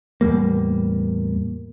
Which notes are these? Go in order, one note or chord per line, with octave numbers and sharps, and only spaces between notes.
E2 A2 G3 A#3